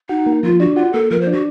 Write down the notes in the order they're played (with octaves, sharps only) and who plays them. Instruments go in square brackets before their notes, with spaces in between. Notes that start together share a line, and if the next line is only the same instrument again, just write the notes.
[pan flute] D#4 [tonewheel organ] F#4
[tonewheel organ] A#3
[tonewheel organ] F3 [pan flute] F4
[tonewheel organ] D4 [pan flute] F#4
[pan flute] F4 [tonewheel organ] F#4
[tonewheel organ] A#3 [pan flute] A4
[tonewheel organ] F3 [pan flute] A#4
[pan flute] C5
[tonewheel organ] D4
[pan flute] F#4